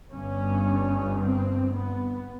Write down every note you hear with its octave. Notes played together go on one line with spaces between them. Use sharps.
G1 G2 C#4
C4
B3